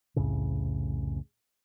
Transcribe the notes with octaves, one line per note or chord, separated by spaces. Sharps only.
C2 F2 A2 C#3